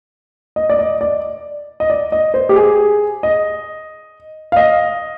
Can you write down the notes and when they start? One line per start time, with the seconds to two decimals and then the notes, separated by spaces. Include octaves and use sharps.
0.56 D#5
0.70 D5
0.79 D#5
1.01 D5
1.80 D#5
1.90 D5
2.12 D#5
2.34 C5
2.49 G4
2.56 G#4
3.23 D#5
4.52 F5
4.56 D#5